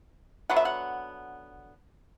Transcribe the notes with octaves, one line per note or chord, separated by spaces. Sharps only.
D3 F#3 B3 F#5
E5
F#5